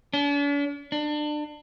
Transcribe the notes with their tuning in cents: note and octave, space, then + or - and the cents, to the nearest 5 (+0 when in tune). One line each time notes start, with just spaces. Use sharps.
D4 -45
D4 +30